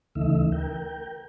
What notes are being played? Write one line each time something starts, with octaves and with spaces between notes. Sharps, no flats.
D2 C#3 E3 A3 D#4 E5
A#4 G5